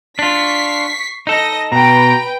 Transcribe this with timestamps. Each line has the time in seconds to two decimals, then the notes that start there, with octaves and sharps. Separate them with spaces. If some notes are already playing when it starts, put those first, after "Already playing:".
0.19 D4 F4 C#6 B6 C7
1.27 D#4 A4 D#5 A#6
1.72 B2 B4 G5 A#5